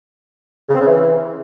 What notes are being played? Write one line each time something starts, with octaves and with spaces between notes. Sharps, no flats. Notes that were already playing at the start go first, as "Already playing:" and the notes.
C#3
C4
C#3
E3